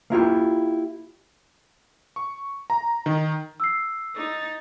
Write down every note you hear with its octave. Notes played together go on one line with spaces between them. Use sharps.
A#3 E4 F4 G4
C#6
A#5
D#3
E6 C7
D#4 A6